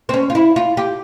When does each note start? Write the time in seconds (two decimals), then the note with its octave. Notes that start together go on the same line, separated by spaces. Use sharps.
0.09 C4
0.14 C#4
0.30 F4
0.35 E4
0.56 F4
0.77 G4